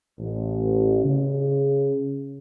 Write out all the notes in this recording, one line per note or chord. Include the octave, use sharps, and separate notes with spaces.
A1
C#3